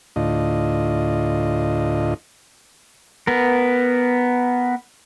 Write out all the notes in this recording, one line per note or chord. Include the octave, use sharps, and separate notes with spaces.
D2 A2 D4 F4 D#5
B3 A#4